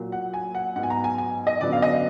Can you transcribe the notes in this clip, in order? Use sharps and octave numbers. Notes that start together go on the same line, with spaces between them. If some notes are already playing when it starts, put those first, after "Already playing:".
Already playing: A#2 F#3 A#3
F#5
G#5
F#5
G#2 F#3 B3 F#5
G#5
A#5
G#5
G#5
D#5
F#2 D3 F#3 B3 D5
F5
D#5